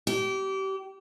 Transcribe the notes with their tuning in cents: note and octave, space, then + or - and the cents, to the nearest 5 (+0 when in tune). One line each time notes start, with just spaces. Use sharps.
G4 -30